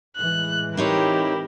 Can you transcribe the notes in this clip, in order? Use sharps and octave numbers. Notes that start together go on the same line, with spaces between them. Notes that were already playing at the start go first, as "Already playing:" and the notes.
A2 E3 G#3 F#6
C4 D#4 E4 G4 A#4 C#5